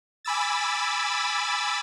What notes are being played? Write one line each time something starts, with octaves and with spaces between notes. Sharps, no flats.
G#5 B5 D6 E6 A6